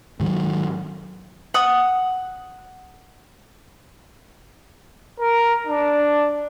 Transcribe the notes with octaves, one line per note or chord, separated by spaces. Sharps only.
G#2 D#3 F3 F#3
F#5 D#6
A#4
D4